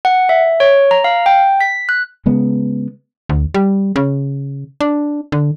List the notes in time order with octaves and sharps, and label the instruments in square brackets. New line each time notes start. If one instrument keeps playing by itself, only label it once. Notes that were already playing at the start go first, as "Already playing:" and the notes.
[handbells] F#5
E5
C#5
A#5
F5
G5
B6
F#6
[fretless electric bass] C#3 G#3 B3
[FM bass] D2
G3
C#3
D4
D3